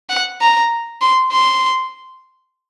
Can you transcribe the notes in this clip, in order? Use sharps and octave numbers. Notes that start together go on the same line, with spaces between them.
F#5
A#5
C6
C6